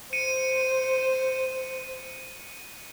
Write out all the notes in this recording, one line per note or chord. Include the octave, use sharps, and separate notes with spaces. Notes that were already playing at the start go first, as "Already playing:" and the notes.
C5 C#7 D#7